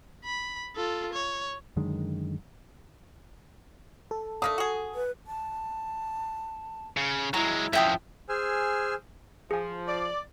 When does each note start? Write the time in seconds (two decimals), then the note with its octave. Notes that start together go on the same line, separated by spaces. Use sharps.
0.25 B5
0.76 F4 A4
1.14 C#5
1.77 F#2 D3 D#3 G#3
4.11 A4
4.42 A3 A#3 D4 D#6
4.58 F#4 G#4
4.95 B4
5.27 A5
6.97 C#3
7.34 F#3 G#3 E4 A#5
7.73 F#2 F3 E5 G5 D#6
8.29 G#4 C5 G#5 E6 F6
9.51 F3 G#4 G#5
9.86 D5